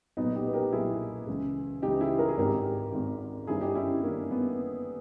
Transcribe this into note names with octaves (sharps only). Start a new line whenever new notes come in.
B1 A#2 B3 D#4
D#4 G4
B4
G4 A#4
B1 A#2 E4 G#4
C#2 C#3 E3
C#2 C#3 E3 D#4 G4
E4 G#4
A#4
G#4
G#1 G#2 D#3 G4 A#4
G#1 G#2 D#3
G1 G2 D#3 E4 G#4
D#4 G4
C#4 E4
G1 G2 D#3 A#3 C#4
B3